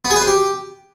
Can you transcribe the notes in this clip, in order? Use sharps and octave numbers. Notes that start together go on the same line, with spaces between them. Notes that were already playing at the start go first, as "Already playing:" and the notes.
B3
G#4
B4
C5
G4